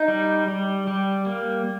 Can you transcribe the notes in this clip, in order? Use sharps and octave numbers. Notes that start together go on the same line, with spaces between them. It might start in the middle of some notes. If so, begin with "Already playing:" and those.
Already playing: D#4
G3
G3
G3
A#3